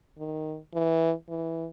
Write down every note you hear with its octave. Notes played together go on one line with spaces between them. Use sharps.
D#3
E3
E3